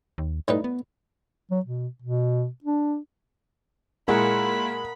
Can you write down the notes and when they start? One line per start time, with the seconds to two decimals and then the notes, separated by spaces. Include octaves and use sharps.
0.18 D#2
0.48 A2 G3 D#4 B4
0.64 B3
1.51 F#3
1.66 B2
2.02 B2
2.64 D4
4.08 A#2 G#3 E4 A#4 F#5 B5